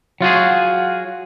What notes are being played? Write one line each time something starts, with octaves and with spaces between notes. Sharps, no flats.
F#3 F4 F#4 G#4